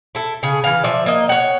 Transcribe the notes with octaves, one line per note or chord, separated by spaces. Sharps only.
E4 A4
C#3 G#4
E3 F5
F3 D5 E5
A#3 D#5
C#5 F#5